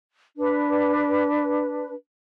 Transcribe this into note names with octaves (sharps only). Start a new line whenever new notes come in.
D4 B4